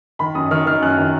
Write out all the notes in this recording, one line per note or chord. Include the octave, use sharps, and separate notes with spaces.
D#3 B5
F#2 D#6
D#3 F6
D#3 F6
F#2 F#6
D#3